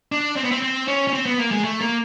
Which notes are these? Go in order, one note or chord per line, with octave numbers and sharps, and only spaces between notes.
D4
C4
B3
C4
C4
C#4
C#4
C4
B3
A#3
G#3
A3
A#3